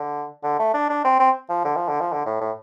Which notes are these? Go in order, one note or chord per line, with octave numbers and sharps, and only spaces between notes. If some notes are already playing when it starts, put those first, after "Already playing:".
Already playing: D3
D3
A3
D4
D4
C4
C4
F3
D3
F3
D3
F3
D3
A2
A2